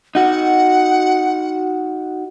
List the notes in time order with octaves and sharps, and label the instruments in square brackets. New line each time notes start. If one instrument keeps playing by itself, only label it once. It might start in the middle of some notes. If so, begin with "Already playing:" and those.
[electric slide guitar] D#4 F#4 [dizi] F#5